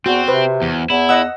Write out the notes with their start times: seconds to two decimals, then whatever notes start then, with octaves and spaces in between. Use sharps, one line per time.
0.06 E2 C4 F#4
0.28 C3 B4 C5
0.62 E2
0.90 E2 E4
1.09 D#5 F#5 E6